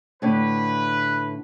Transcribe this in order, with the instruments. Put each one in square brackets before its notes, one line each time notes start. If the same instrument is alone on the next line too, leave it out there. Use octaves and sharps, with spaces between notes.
[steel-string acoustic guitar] A2 D3 [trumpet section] B4